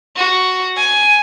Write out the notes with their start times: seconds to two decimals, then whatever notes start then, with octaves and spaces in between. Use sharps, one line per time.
0.17 F#4
0.77 G#5